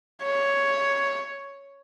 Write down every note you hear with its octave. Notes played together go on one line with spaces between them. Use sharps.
C#5